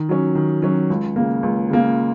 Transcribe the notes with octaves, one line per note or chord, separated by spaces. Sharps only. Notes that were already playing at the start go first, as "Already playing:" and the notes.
Already playing: D#3
F#3 C#4
D#3
F#3 C#4
C#2
C#3 A#3
C#2
C#3 A#3